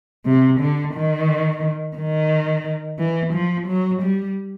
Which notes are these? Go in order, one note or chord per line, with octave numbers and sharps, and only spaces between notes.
C3
D3
D#3
D#3
E3
F3
F#3
G3